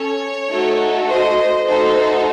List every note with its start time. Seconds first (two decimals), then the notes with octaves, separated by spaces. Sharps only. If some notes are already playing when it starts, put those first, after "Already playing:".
Already playing: C#4 A4 C#5
0.51 A3 D#4 F#4 A4
1.09 C5 D#5
1.67 A3 D#4 F#4 A4 C5 D#5